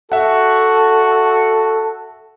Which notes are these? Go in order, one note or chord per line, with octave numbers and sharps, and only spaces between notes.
F#4 A4 E5 F#5